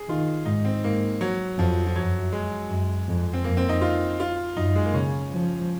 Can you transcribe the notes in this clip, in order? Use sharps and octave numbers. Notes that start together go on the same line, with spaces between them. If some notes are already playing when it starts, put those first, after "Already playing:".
Already playing: G#4
D#3 F4
G#2 D#4
C4
G#2 A#3
F#3
F2 F3
F3
F#2 F#3
G#3
F#2
F2
C4
F2 A#3
C4
D#4
F4
F4
F#2 D#4
G#3
A#3
C#3 C#4
F3